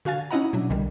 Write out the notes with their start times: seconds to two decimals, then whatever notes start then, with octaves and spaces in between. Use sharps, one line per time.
0.05 D3 F#4 F5 G#5 A6
0.31 C#4 D#4 E4 D#5 F#5 A#5
0.53 B2 F#3 D4
0.70 B1 D3 D#3 G3